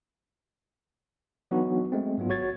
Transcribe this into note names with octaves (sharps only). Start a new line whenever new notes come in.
E3 F#3 B3 D4 D#4 F#4
G#3 A3 C4
G#2 F#3 B3 F4
G#1 F#4 C#5 G#6 A6